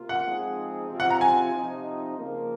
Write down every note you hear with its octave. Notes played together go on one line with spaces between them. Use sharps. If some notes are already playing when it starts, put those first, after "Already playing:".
Already playing: C3 A#3 F4
F#5
F3 G#3 C4 D#4 G#4
C3 F3 C4 F4
F#5
A#5
G#5
C3 F3 C4 D#4
C#3 F3 A#3